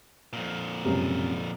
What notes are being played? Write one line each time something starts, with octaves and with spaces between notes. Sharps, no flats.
F2 A#2
C#2 F#2 C3